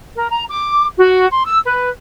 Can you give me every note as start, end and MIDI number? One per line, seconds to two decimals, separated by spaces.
0.14 0.28 70
0.29 0.44 82
0.48 0.84 86
0.98 1.27 66
1.31 1.44 84
1.45 1.59 88
1.66 1.89 71